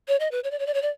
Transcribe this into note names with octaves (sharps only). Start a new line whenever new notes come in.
C#5
D#5
B4
C#5
D5
C#5
D5
C#5
D5